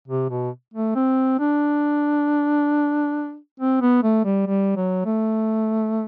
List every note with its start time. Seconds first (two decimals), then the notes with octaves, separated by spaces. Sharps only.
0.08 C3
0.30 B2
0.74 A3
0.95 C4
1.39 D4
3.60 C4
3.81 B3
4.03 A3
4.25 G3
4.47 G3
4.76 F#3
5.05 A3